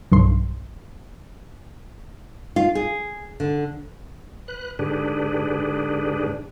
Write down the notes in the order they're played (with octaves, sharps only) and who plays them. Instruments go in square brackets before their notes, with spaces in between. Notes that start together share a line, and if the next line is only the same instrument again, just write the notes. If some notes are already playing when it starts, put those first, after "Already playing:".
[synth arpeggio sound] B1 G2 C6
[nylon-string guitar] F4
G#4
D3
[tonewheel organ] B4 F#6
G#2 D3 D4 G4 G#4 B4